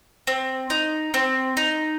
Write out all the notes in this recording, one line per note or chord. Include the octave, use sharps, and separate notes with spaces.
C4
D#4
C4
D#4